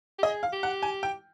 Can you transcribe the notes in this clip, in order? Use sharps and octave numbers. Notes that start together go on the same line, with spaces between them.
G4
G#4 D#5
F5
G4
F#5
G#5
G5